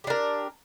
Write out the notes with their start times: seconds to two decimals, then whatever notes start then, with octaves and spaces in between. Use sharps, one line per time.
0.04 G4
0.07 D4
0.10 A#4